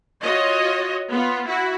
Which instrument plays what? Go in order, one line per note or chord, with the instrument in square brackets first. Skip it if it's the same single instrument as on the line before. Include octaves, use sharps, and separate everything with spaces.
[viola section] F4 F#4 C#5 D#5
B3 F4
E4 F#4